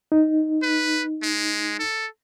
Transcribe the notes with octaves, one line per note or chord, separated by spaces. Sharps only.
D#4
B4
G#3
A4